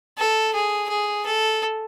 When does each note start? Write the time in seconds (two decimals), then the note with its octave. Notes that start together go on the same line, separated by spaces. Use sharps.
0.18 A4
0.54 G#4
0.89 G#4
1.26 A4